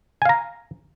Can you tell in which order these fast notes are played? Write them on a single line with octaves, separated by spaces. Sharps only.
G#5 F5 A#5